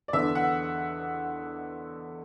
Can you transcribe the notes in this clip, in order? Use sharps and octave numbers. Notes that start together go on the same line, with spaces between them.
D5
E2 D3 E5
F#5